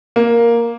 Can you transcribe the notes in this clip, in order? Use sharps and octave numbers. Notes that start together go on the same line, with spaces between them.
A#3